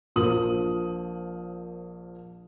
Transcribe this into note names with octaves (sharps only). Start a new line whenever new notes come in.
A#1 F3 A#3 D#6 F#7